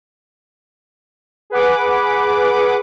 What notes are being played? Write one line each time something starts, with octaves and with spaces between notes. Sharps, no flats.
G#4 B4 F#5 D6